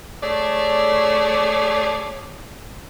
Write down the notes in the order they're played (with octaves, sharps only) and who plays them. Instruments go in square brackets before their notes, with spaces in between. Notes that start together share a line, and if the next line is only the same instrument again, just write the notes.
[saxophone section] A3 G#4 C#5 D5